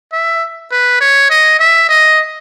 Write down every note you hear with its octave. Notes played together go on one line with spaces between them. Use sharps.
E5
B4
C#5
D#5
E5
D#5